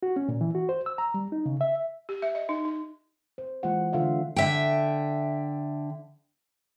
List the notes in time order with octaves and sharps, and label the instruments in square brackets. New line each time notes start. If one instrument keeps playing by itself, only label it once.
[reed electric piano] F#4
C#4
A#2
E3
F#4
C5
E6
A#5
G3
D#4
C#3
E5
[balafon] G4
E5
D#5
D#4
D#4
[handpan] C5
E3 G#3 A#3 F4 C5 F#5
D3 D4 F4 E5 F5
[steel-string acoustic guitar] D3 E5 G5